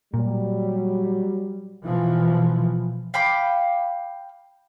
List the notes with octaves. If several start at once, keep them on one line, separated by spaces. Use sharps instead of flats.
A#2 F#3 G3
B2 E3 F3
F5 G5 B5 D6